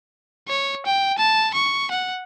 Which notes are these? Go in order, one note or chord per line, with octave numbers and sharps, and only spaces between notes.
C#5
G5
A5
C#6
F#5